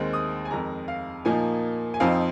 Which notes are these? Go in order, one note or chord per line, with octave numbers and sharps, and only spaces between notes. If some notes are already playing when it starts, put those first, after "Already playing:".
Already playing: D#2 D#3 G#3 C4
D#6
G#5
F2 D#3 G#3 A#5
F5
A#2 F3 A#3 D#4 G#5
G#5
F2 F3 C4 D#4 F5